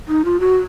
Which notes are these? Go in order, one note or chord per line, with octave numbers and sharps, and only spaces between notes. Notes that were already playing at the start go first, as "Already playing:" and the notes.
D#4
F4
F#4